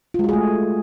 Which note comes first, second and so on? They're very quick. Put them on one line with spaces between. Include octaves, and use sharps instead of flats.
F4 G#3 F#4 G#4 A3